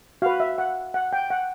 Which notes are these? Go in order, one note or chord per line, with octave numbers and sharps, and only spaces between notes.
F#4 B4 F5
E5
F#5
F#5
G5
F#5